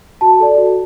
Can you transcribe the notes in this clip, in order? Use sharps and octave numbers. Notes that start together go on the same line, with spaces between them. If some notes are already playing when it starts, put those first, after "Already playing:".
F#4 A5
A4 D5
F#4